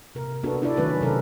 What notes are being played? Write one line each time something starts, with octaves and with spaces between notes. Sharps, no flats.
C3 A#4
B3 D4 F#4 A4
D4 E4 F#4 A4 D5
D#3 F#3 A3 C#4 F#4 B4
C3 A4 A#4